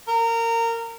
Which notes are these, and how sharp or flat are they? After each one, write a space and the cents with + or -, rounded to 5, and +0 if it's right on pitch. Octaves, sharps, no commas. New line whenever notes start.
A#4 -20